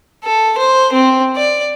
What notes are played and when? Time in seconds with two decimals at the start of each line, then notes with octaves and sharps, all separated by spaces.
0.24 A4
0.58 C5
0.93 C4
1.36 D5